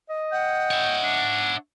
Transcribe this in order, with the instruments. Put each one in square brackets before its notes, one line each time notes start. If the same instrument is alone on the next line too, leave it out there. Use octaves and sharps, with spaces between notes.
[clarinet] D#5
[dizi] F#5 [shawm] G5
[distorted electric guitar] C#5 E5
[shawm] D4